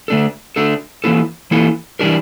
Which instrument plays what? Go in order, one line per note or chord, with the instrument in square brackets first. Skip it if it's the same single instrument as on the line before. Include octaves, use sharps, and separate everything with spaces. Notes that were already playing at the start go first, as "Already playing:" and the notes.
[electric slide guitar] D3 A3 D4 A4
D3 A3 D4 A4
E3 A#3 E4 A4
E3 A#3 E4 A4
E3 G3 D4 G4 A#4